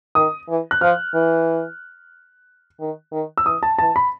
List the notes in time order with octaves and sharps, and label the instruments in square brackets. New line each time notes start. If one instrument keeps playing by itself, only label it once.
[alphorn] D#3 [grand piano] D#6
[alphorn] E3
[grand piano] F#6
[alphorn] F3 [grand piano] F6
[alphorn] E3
D#3
D#3
[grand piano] E6
[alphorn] E3 [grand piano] D#6
[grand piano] A5
[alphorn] E3 [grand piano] A5
[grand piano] B5